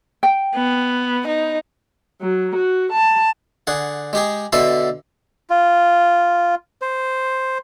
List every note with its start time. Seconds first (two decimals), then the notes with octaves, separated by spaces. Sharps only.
0.23 G5
0.55 B3
1.27 D#4
2.21 F#3
2.55 F#4
2.92 A5
3.67 D3 G#4 F#5
4.13 G#3 G4 G#4
4.53 B2 D3 A4 E5 B5 C6
5.50 F4
6.82 C5